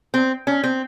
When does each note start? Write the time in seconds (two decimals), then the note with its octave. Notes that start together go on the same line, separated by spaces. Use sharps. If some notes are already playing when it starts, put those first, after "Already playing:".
0.14 C4
0.47 C#4
0.64 C4